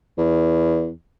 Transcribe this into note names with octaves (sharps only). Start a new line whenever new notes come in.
E2